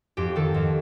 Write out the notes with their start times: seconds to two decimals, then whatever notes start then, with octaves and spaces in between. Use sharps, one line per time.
0.17 F2 G4
0.36 D#3 A4
0.54 F2